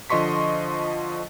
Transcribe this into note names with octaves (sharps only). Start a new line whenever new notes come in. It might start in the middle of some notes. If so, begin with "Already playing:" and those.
D3 F3 D#5 C6 C#6 B6